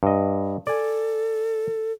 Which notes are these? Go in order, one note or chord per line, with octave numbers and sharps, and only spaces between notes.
G2 D#5
A4 D5 G#5